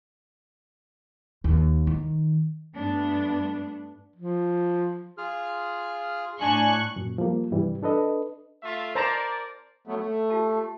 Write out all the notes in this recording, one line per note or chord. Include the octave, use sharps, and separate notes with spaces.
D#2
D#3
G2 A3 B3 D4
F3
F4 G#4 F6
A2 D4 G#5 C#6 F#6
F#2 A#2
F3 G3 A#3
G2 C3 E3 G3
D4 A4 B4 D#5
A3 F4 E5
A#4 C5 D5 A5 A#5
F#3 A3 B3
A3
F4 G4 A5
G4